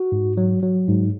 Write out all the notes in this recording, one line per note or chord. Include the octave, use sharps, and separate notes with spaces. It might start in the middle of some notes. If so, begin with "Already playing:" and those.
Already playing: F#4
G#2
F#3
F#3
G#2